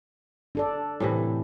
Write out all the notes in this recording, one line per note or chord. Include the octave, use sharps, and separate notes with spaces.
D4 A4 D5
A2 C3 E3